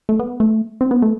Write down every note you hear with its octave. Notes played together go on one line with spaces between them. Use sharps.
A3
B3
A3
C4
B3
A3